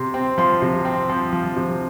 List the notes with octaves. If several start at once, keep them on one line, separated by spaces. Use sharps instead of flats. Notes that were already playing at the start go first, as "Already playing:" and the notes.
Already playing: C3 C6
C4
F3 C6
C3
C4
F3
F3
C3